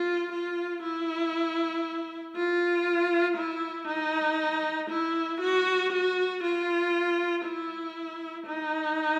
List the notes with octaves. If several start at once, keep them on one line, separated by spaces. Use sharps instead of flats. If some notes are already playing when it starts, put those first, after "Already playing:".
Already playing: F4
F4
E4
F4
E4
D#4
E4
F#4
F#4
F4
E4
D#4